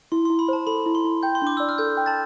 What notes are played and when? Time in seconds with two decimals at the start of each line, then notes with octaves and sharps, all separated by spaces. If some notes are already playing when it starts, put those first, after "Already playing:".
0.12 E4 C6
0.25 E4 C6
0.39 B5
0.48 C5 A5
0.67 A4 B5
0.86 E4
0.95 C6
1.04 E4
1.23 G5 G6
1.35 C6
1.42 D4 D6
1.57 D5 E6
1.69 F6
1.78 A4 G6
1.97 G5
2.06 A5 A6